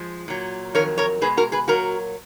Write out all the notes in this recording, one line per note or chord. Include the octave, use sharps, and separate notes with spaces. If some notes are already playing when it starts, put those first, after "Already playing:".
Already playing: F3 G#3
A#2 F#3
F2 D#3 F#3 A#4 C#5
A#4 C#5
B2 G#3 G#4 B4
F#4 A#4
G#4 B4
A#2 F#3 F#4 A#4